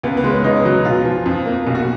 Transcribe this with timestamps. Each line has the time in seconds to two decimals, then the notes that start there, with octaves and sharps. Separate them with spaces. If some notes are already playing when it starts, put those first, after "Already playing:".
0.03 C#2 B3
0.17 B3
0.24 G#3
0.31 C#4
0.44 C#2 D#4
0.65 F#3
0.85 B1 F4
1.05 F3
1.26 F2
1.46 A#3
1.67 B1
1.75 F#4